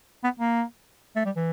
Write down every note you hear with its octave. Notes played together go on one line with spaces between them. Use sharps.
B3
A#3
A3
G3
E3